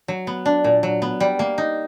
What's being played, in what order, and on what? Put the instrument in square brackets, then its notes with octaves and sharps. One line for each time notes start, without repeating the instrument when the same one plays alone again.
[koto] F#3
B3
D4
A#2
F#3
B3
G3
A#3
D#4